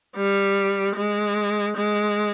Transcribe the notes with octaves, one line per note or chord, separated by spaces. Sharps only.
G3
G#3
G#3